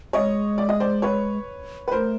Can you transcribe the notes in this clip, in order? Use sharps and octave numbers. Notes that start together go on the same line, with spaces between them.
G#3 C#5 D#5
D5
D#5
C5 D5
B4 C#5
B4
A3 A#4 C5